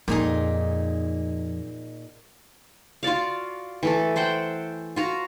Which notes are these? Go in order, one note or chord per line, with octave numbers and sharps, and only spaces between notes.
F2 A#2 D#4 G#4
F4 F#4 D5 F5
E3 A3 A4
A4 C5 F#5 G5
F4 F#4 A#5